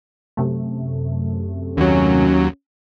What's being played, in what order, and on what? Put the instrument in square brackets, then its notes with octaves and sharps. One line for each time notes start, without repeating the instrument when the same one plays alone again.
[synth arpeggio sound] F#2 C3 A3
[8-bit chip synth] D#2 F#3 [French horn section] C#4